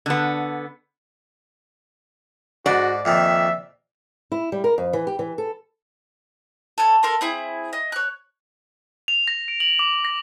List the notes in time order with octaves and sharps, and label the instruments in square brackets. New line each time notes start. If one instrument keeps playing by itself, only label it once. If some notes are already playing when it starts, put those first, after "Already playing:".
[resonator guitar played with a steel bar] D3 B3
[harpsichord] G#2 [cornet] F#4 [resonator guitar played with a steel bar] D5
[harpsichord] F2 A#2 D#3 [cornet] E5
[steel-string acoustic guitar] E4
G3
A#4
F2
E3
G4
E3
A4
[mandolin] A4 C#5
A4 A#4 C6
C4 E4 G#4
D#5
C#5 F#6
[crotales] F7
A#6
D7
F#7
D6
A#6